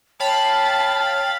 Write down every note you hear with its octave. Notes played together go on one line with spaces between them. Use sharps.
C#5 F5 G5 A5 B5 A6